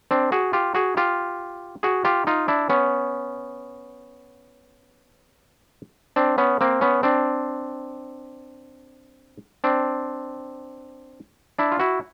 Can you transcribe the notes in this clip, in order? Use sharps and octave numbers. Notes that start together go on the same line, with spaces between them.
C4 D4
F#4 G#4
F4 G4
F#4 G#4
F4 G4
F#4 G#4
F4 G4
D#4 F4
D4 E4
B3 C#4
C4 D4
B3 C#4
A#3 C4
B3 C#4
C4 D4
C4 D4
D4 E4
F4
E4 F#4